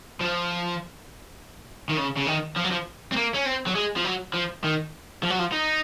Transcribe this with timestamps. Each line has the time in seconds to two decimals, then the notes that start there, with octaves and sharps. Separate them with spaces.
0.21 F3
1.89 D#3
1.97 C#3
2.17 C#3
2.27 D#3
2.57 F3
2.65 F#3
2.71 F3
3.12 C4
3.16 A#3
3.34 C#4
3.46 C4
3.67 F#3
3.75 G#3
3.97 F3
4.05 F#3
4.34 F3
4.64 D#3
5.23 F3
5.30 F#3
5.39 F3
5.52 D#4